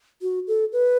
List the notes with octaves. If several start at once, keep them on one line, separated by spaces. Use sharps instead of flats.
F#4
A4
B4